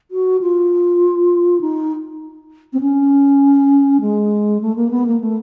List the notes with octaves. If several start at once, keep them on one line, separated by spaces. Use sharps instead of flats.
F#4
F4
D#4
C4
C#4
G#3
A3
A#3
B3
A#3
A3